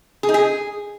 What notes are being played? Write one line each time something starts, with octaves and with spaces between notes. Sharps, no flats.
G#4
D#4
G#4